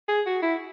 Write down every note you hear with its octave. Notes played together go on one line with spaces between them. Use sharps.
G#4
F#4
E4